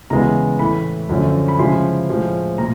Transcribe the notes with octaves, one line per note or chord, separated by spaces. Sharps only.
E2 C#3 E3 G#3 B3 A#5
A2 E3 A3 B5
F#2 D3 F3 A3 C#4
B5
C#3 F3 G#3 C#4 E4 C6
A2 F3 G#3
A#2 A#5